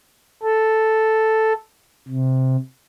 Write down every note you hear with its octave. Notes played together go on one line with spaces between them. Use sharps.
A4
C3